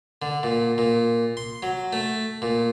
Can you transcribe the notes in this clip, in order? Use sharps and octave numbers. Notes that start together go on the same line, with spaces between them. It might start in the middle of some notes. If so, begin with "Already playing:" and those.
D3
A#2
A#2
C6
F#3
A3
A#2